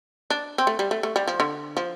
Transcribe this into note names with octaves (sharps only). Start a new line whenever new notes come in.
D4
C4
A3
G3
A3
A3
G3
F3
D3
F3